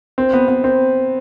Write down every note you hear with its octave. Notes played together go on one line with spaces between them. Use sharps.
C4
B3
B3
C4